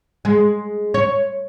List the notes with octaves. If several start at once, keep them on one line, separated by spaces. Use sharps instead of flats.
G#3
C#5